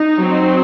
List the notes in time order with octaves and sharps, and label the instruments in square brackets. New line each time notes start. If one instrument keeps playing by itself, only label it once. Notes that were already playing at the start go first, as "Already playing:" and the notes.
Already playing: [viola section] D#4
F#3 C4